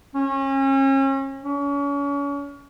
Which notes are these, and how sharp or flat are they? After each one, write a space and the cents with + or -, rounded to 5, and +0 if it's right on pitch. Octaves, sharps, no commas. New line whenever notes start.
C#4 -35
C#4 +35